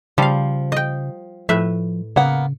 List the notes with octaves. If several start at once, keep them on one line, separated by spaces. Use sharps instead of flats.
C#3 F3 G3 F5
D#5 G5
A2 F3 B4 E5
C#3 A#3 B3 F#5